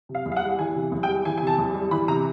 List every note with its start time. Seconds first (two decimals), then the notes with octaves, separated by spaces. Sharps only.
0.09 C3
0.15 F5
0.26 E2
0.32 F5
0.36 F#5
0.42 G3
0.59 E3 G#5
0.75 C3
0.92 E2
1.03 G5
1.08 G3
1.25 E3 G#5
1.38 C3 G#5
1.47 A5
1.58 E2
1.74 G3
1.91 E3 B5
2.08 C3 A#5